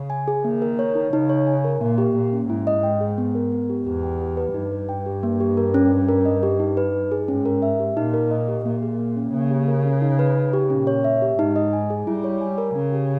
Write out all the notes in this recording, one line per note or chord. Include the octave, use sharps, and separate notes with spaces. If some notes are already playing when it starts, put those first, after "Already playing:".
Already playing: C#3
G#5
G#4
D#3 A#3
A#4
C#5
D#4
C#3 D#4
C#5
G#5
A#4
A#2 A#3
G4
A#2 A#3
C#4
G#2 E4
D#5
G5
G#4
B3
A#4
B3
G4
E2 G4
G5
G4
B4
G2 D#4
B4
G5
G4
A#3
G4
A#4
C#4
C#4
A#4
D#5
G4
D#4
B4
D#4
G#4
G#2 C#4
A#4
E5
G4
A#2 D#4
A#4
D#5
G4
A#2 A#3
G#4
A#3
C#4
C#3 A#3
G4
A#4
C#4
D#4
B4
D#4
G4
A#2 C#4
C#5
E5
G4
G#2 D#4
D#5
G#5
G#4
G3 E4
C#5
G#5
A#4
C#3 C#4
G4